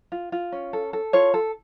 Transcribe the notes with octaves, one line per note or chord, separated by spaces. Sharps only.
F4
F4
C#4
A4
A4
F4 C#5
A4